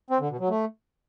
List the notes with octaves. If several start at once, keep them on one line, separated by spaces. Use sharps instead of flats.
C4
D3
B2
F#3
A3